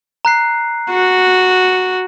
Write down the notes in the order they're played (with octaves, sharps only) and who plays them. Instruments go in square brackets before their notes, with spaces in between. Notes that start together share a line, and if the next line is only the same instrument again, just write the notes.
[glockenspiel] A#5 F#6 C7
[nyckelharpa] F#4